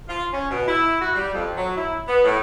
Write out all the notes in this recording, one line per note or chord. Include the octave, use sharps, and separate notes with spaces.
F4
C#4
B2
E4
F#4
G3
F2
F#3
E4
B3
A2